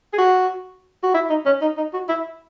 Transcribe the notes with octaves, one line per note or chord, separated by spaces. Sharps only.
G#4
F#4
F#4
E4
D#4
C#4
D#4
D#4
F#4
E4